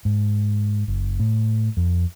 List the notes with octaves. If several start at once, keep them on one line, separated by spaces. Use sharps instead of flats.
G#2
F#1
A2
F2